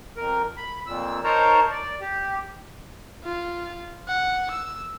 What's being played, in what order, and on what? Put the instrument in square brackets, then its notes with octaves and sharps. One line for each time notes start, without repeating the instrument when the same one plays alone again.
[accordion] F2 A#4
B5
F2 A#2 E6
D#4 A#4 C5 C#5 A5 A#5
D5
G4
[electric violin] F4
F#5
E6